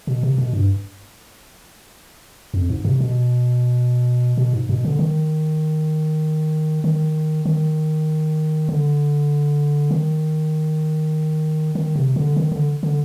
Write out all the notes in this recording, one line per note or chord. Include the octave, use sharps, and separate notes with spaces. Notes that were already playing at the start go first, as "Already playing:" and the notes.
B2
C3
B2
G2
F2
G#2
C3
B2
B2
G#2
B2
D3
D#3
D#3
D#3
D3
D#3
D#3
C3
D3
D#3
D3
D3